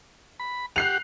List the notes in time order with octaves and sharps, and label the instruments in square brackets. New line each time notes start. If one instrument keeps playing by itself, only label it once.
[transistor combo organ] B5
[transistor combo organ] G4 F#5 [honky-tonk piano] F#6 C7 F7